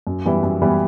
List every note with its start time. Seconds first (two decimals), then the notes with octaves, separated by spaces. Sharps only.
0.07 F#2
0.25 E3 G3 B3 E4
0.43 F#2
0.62 E3 G3 B3 E4